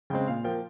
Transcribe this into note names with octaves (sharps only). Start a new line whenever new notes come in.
C#3 G#3 C4 G5
A#2 F5
F3 A#3 G5